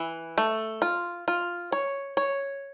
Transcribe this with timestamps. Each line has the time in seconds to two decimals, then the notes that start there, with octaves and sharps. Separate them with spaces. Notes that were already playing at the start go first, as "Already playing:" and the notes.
Already playing: E3
0.38 A3
0.82 F4
1.28 F4
1.72 C#5
2.17 C#5